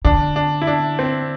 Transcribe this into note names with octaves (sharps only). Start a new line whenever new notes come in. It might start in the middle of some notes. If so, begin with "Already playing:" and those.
D3 D4
D4
E4
D4
C4